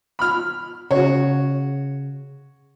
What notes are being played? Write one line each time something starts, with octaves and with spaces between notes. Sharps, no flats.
B5 F6
C#3 F#4 C#5